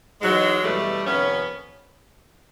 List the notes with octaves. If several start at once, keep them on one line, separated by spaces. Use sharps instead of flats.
G#2 E3 F#3 G#3
E2 B2 G3 A3
F2 C3 D#3 B3 C#4